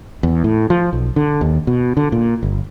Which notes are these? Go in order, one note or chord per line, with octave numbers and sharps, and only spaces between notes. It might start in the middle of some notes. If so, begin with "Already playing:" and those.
E2
A2
F3
B1
D3
D#2
B2
D3
A#2
G1